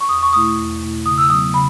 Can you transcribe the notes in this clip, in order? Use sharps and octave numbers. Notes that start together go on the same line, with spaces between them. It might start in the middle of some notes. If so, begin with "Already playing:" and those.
C#6
E2 D#6
C#6
B2 A3 E4 D#6
E2
B2 A3 E4
C#3 D#6
E6
F#3 B3 D#6
C#3 B5